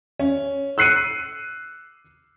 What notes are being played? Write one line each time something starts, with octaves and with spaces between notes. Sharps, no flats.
C#4
E6 F#6 C7 C#7 D#7